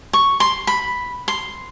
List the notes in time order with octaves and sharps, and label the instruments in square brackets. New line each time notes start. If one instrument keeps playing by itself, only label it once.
[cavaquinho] C#6
C6
B5
C6